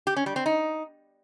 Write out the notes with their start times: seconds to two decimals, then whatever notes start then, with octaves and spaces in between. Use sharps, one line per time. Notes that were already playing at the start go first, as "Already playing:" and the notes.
0.07 G4
0.16 C#4
0.26 G3
0.36 C4
0.46 D#4